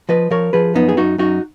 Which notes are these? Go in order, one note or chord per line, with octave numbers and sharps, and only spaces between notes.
F3 B4 D#5
F3 A#4 C#5
F3 G#4 B4
F#2 B3 D#4
G#4
F#2 D#4 F#4
F#2 D#4 F#4